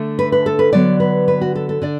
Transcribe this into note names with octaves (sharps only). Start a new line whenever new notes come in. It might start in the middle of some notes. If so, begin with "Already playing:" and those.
Already playing: D3 A3
B4
B4
A4
B4
D3 F#3 B3 D5
B4
B4
F#4
A4
A4
D3 D5